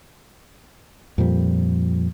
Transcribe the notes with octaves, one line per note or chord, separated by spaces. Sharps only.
F2 A#2 F3 G3